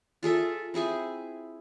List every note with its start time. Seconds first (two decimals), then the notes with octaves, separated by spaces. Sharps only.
0.23 F4 G#4 A4 E5
0.74 C4 E4 G#4 G#5